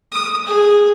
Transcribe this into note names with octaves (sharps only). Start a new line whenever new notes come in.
D#6
G#4